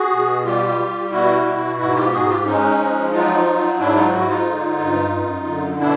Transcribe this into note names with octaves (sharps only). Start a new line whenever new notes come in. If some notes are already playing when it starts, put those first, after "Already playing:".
Already playing: F#4 G#4
B2
G3 F4 G4
G3
B2 E4 F#4
B2
G#2 E4 F#4
F4 G4
G#2 F#4 G#4
F4 G4
G#3 C#4 D#4
F3
F#3 D#4 F4
F#3
G#2 D4 E4
D#4 F4
G#2 E4 F#4
D#4 F4
D3
G2
F#2
D3
B2 D4 E4